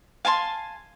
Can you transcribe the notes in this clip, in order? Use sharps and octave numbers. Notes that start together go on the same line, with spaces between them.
F5 G#5 A5 C6